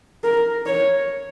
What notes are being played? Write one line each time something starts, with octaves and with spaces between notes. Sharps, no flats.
A#4
C#5